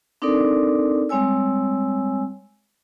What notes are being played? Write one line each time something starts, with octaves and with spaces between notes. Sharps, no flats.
C4 D4 D#4 A4 A#4 D5
G3 G#3 C4 C#5 G#5 E6